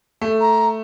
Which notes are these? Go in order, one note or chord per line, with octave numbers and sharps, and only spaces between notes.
A3
A#5